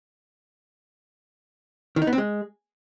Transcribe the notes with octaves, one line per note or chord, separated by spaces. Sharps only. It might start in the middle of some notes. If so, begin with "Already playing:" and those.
D#3
D#4
B3
C4
G#3